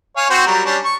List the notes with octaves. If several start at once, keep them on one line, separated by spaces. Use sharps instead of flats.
C#5 F5 G#5
C4 F#4 C5
F#3 G3 A#4
G3 C#4 D4
C#6